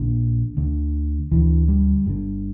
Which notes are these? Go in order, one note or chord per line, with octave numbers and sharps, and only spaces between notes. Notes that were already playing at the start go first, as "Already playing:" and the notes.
Already playing: A#1 A#2 D3
D2 D3
D2 D3 E3
G3
G1 G2 D3